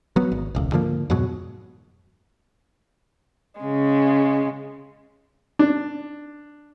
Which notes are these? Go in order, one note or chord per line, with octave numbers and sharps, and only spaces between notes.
F#3 B3
G#1
E1 C#2
G#2 D3 F3 A#3
F2 G#2 B2 F#3
C#3 G#3
D4